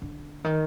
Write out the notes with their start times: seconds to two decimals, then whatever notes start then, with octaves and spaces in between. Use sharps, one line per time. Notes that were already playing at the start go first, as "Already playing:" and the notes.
0.02 D3
0.44 D#3